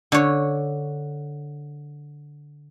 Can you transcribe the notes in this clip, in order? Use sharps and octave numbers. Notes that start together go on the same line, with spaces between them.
D3 C#5